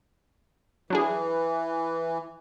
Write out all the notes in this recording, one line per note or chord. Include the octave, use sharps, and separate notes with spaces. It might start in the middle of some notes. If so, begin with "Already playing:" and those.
E3 F#3 D4 G#4